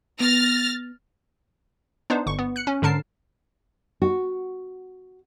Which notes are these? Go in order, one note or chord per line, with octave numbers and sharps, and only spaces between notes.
B3 F6 A6 A#6
B3 D4 D#4 C5
G1 C#6
B3
F#6 C#7
C#4
G#2 D3 A#4 A5 C7
F#4